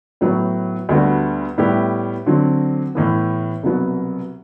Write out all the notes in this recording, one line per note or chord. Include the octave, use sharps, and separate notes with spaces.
A2 F#3 B3
D2 D3 G3 B3 F#4
A2 G3 B3 E4 G4
D3 F#3 C4
A2 E3 B3
C2 B2 F#3 B3